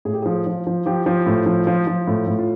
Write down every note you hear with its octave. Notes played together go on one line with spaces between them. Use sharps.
A2 G#4
G4
F3 G#4
F3
F3
F3 G4
F3
A2
F3
F3
F3
A2
A2
F4